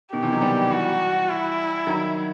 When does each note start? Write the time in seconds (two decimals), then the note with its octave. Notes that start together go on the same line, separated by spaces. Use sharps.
0.12 B2 D#3 G4
0.22 C3 E3
0.32 D#3 F#3
0.41 G3 B3
0.71 E3 G3 F#4
1.28 E4
1.87 D#3 F#3